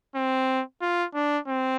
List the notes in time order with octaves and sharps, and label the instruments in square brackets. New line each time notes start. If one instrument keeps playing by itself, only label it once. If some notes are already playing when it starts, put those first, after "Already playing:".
[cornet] C4
F4
D4
C4